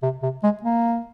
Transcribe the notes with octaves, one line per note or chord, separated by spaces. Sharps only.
C3
C3
G#3
A#3